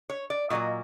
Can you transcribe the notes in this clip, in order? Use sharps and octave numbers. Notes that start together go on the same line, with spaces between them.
C#5
D5
A#2 F#3 A#3 D#5